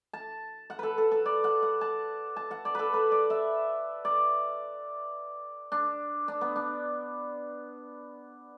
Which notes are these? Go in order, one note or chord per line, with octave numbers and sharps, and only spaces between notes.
A5
F#5
A4 B4
A4
A4
D5
F#5
F#5
A5
A5
F#5
D5
A4 B4
B4
D5
E5
D5
D4
D4
B3
D4